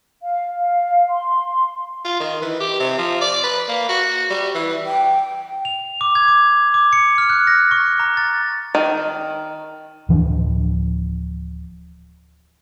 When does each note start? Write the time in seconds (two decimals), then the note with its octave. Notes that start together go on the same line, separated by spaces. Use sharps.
0.22 F5
0.59 F5
1.09 C6
2.04 F4
2.20 D#3
2.42 E3
2.60 G4
2.79 C3
2.98 F3
3.21 D5
3.43 B4
3.68 A#3
3.89 F#4
4.30 G3
4.55 E3
4.86 G5
5.65 F7
6.01 D6
6.15 G#6
6.28 D6
6.74 D6
6.93 C#7
7.18 F6
7.30 F#6
7.47 A#6
7.71 C#6
8.00 A#5
8.17 A6
8.75 D#3
10.09 D1 E3 F3 D4